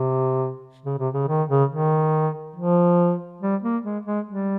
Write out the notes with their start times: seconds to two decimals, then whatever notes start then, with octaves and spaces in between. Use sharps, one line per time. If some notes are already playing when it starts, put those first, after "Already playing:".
Already playing: C3
0.85 C#3
0.99 C3
1.14 C#3
1.28 D#3
1.49 C#3
1.70 D#3
2.56 F3
3.41 G3
3.62 A#3
3.84 G#3
4.05 G#3
4.27 G3